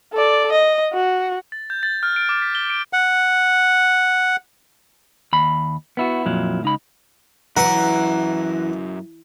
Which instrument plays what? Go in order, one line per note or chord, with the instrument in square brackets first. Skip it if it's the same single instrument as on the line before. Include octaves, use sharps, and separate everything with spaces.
[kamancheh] A4 D5
D#5
F#4
[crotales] A6
G6
A6
F6
D7
D6
B6
G7
D7
[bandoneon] F#5
[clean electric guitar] D#2 B5
B3 E4 F#4
F2 A#2 F#3 E4
C#2 D#4 B5
[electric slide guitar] F#2 F#3 E4 [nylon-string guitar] E3 [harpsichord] F#5 C6 [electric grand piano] A#5